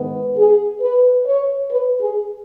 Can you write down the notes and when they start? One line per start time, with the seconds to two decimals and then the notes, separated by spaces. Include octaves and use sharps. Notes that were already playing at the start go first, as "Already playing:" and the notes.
Already playing: G#2 D#3 B3
0.37 G#4
0.81 B4
1.26 C#5
1.70 B4
2.00 G#4